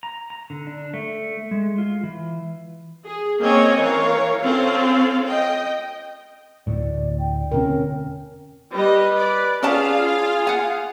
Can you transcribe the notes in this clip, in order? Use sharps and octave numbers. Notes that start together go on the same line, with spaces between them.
A#5
A#5
D3
D4
A3
G#3
F4
E3
G#4
A#3 C4 C#4 C#5 D#5 G#5
E3 A#4 C#5 F5
C4 C#4 F4 A4 F5
D#5 G5
D2 A2 D5
G5
E1 D3 C4 C#4 A#4
G3 B4 D#5
D5
C#4 F4 G#4 D5 F5 A5
F#5 G#5